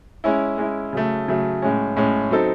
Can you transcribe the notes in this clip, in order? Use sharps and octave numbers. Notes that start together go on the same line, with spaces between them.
G#3 C#4 E4
G#3 C#4 E4
C#3 F#3 A3
C#3 F#3 A3
A2 G#3 C#4
A2 G#3 C#4
F#3 C4 D#4 A4